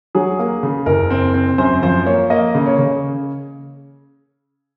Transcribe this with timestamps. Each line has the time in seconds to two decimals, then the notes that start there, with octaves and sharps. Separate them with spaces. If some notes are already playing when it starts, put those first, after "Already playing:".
0.15 F#3 G#4
0.39 A#3
0.63 C#3
0.86 F#1 A#4
1.10 C4
1.34 C4
1.58 F#2 C5
1.83 F3 C5
2.06 A#3 C#5
2.30 A#3 D#5
2.55 C#3
2.66 C#5
2.79 C#3